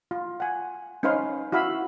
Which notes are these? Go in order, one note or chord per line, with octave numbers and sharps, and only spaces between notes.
F4
F#5 G#5
C#4 D#4 B4 C5 F5 C6
E4 F#4 F5 B5 E6